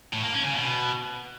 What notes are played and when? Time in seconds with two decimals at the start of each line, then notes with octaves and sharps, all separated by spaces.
0.13 A2
0.23 A#3
0.34 C#4
0.44 C#3
0.54 B2